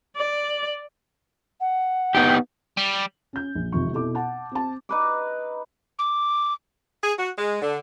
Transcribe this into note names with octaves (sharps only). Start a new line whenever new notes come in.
D5
F#5
B3 D#4 G4 G5
G3
C#4 G6
A#1
G#1 F2 C3 C#6
B2 E4 A4 D6
F#5 A5
C4 A5
D#4 B4 D6
D6
G#4
F#4
G#3
D3